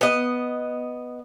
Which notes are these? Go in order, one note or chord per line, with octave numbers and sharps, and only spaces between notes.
B3 D#5